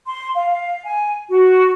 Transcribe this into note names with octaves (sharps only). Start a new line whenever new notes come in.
C6
F5
F5
G#5
F#4